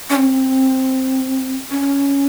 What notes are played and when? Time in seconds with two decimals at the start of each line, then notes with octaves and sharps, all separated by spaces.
0.10 C#4
0.16 C4
1.71 C#4